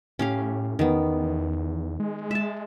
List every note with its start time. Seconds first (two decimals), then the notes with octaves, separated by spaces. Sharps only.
0.19 A2 C#4 G4 F5
0.79 E2 D#3 B3
2.00 G#3
2.31 E5 A5